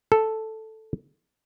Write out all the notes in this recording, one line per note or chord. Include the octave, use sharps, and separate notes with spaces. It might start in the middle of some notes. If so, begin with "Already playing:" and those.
A4